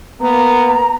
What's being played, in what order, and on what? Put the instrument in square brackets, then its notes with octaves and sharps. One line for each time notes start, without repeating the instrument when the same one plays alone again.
[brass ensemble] A#3 B3 [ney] A#5